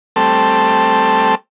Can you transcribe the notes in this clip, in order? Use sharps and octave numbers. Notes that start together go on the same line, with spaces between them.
G3 A3 C4 A4